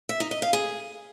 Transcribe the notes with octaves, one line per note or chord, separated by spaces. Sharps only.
E5
D#4
D#5
F5
G#4